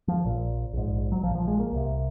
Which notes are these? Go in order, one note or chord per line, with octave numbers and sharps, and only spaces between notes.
F3
A#1 A#2
A#1 G#2
F#3
A#1 A#2 F3
F3
G#3
A#3
C2 C3